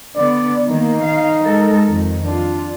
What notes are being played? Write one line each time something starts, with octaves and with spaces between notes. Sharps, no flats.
D3 B3 D5
D#3 A#3 D#4
D#3 F5
G#3 A4 A#4
F2 D#3
D4 F4